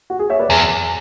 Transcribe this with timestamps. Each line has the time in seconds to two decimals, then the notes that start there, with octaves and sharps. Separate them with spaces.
0.10 F#4
0.19 G#4
0.30 C#5 E5
0.40 B4 D5
0.50 E2 G#4